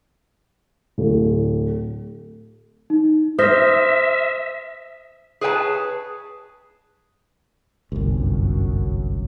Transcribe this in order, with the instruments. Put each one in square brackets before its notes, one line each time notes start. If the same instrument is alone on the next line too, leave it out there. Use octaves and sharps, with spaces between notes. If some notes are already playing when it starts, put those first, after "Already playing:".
[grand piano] D1
[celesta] D#4
[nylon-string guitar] C5 [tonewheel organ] E5 [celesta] D#6 F6 A#6
[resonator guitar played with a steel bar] G#4 B4 C#5 G5 A5
[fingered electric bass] G1 C2 [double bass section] F#2